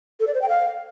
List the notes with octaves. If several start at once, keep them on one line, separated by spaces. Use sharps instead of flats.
A4
D5
C5
G5
F5